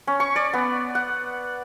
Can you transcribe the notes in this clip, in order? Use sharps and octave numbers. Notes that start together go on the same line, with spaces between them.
C#4
C#6
D5
B3
F#5